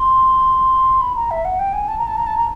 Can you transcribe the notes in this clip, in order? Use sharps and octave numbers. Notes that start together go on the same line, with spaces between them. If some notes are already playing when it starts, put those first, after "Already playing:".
Already playing: C6
B5
A#5
E5
F#5
G5
G#5
A5
A#5
A5
A#5
A5
A#5